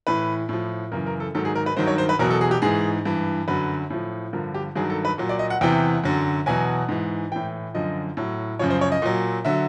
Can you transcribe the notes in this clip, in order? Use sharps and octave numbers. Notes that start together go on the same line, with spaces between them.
A2 E3 B4
A2 F3
F#2 C#3 E3 A#4
A#4
A4
G#2 D#3 F#3 A4
G#4
A#4
B4
G2 D#3 F#3 C5
C#5
C5
B4
E2 B2 F#3 A#4
A4
G#4
G4
G#2 E3 G#4
G2 E3
F#2 D3 F#3 B4
A2 F3
G2 D3 F3 A#4
G4
G2 D#3 F#3 G#4
A4
B4
A#2 F#3
D5
D#5
F#5
E2 C3 E3 G5
F#2 D3 F#3
E2 B2 F#3 G#5
G#2 E3
A2 E3 G5
F#2 D3 F3 D#5
A2 F#3
F#2 C#3 F3 C#5
C5
C#5
D#5
A#2 F#3
D3 F#3 E5